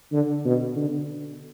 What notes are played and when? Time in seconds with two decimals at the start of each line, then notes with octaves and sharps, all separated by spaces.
0.12 D3
0.45 B2
0.76 D3